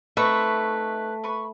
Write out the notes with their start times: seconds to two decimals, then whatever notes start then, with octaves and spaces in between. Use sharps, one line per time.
0.17 A3 C4 D#4 B4 E5 C#6
1.24 B4 B5 C#6